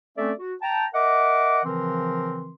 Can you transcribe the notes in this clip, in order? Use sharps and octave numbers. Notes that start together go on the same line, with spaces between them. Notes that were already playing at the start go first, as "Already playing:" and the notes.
A3 C4 C#4 A4 D5 E5
F#4
G5 A5 A#5
A#4 D#5 E5 F#5 D6
C#3 E3 F3 C4 A#4 C6